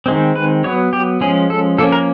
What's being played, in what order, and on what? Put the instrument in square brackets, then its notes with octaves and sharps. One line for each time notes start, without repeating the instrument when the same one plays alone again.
[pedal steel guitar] D#3 G#3 C4
B4
F#3 B3 C#5
G4
F3 G#3 C#4 G#4
A4
F3 A#3 C#4 A4
A#4